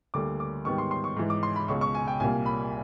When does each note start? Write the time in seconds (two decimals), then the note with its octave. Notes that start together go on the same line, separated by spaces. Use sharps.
0.14 D2 D3 G3 A#3 D6
0.40 D6
0.65 G#2 D#3 G3 B3 C#6
0.78 C6
0.91 C6
1.04 C#6
1.16 G#2 E3 G#3
1.30 D6
1.43 C6
1.56 B5
1.68 C#2 B2 G#3 C#6
1.81 C#6
1.95 G#5
2.08 G5
2.20 C2 A#2 G3 A#3 G#5
2.46 B5